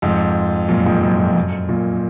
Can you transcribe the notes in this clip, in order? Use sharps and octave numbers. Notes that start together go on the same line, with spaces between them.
F2 G#2
F#2 A#2
F2 G#2
F#2
F2
F#2
F#2 A#2